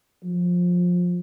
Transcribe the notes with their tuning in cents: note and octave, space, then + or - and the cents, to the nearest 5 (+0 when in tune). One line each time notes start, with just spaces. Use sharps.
F3 +20